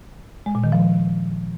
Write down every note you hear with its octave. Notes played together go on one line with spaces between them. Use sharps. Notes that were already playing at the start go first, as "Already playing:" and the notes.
G#3
A#2
D#3
F3